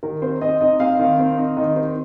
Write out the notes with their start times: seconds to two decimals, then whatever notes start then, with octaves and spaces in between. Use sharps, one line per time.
0.03 D#3 A#4
0.22 C4 C5
0.42 C4 D#5
0.61 D#4 D#5
0.80 C4 F5
0.99 D#3
1.19 C4
1.37 D#4
1.57 D#3 D#5
1.76 C4 C5